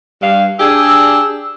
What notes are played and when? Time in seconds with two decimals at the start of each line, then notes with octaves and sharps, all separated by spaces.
0.21 G2 F5
0.59 D4 G4 G#4 E6